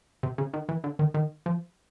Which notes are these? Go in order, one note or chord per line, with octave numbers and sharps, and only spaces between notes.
C3
C#3
D#3
E3
D3
D#3
D#3
F3